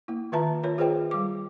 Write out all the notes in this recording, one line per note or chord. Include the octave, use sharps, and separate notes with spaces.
A#3 E4
D#3 F4 B4 E5 A5 A#5
F4 A#4 C#5
F4 G#4 B4 C5 D#5 G5
G3 D6